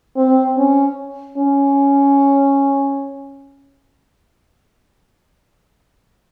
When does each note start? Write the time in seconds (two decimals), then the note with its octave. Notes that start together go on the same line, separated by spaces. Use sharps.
0.17 C4
0.58 C#4
1.38 C#4